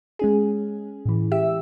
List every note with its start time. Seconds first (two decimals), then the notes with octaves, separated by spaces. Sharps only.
0.19 G#3 C#4 G#4
1.05 A2 E3
1.32 G4 E5 E6